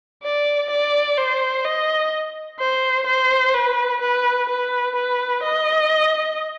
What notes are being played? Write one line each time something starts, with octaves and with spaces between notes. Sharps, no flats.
D5
D5
C5
D#5
C5
C5
B4
B4
B4
B4
D#5